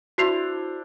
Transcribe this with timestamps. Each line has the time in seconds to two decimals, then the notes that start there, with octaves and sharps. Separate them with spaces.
0.18 D4 E4 F#4 C5 C7 F7